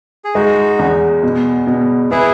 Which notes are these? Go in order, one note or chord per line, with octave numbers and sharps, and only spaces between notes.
G#4
G#3 D#4 F#4
E2
B2
B2
B3 E4 G#4